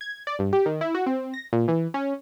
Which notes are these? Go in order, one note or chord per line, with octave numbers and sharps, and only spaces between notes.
G#6
D5
G2
G4
D#3
E4
F#4
C4
A#6
A#2
E3
C#4